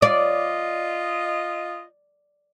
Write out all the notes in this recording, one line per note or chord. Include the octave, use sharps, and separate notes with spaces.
F4 D5 D#5